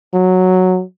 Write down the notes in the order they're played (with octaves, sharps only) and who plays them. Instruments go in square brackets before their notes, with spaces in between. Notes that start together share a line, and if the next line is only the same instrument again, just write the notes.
[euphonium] F#3